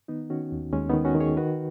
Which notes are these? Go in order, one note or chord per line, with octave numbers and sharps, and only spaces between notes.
D#3 B3 D#4
D#3 C#4 F#4
D#2
D#2 G#3 C#4
D#3 B3 D#4
C#4 F#4
D#3
G#4 C#5
D#3 F#4 B4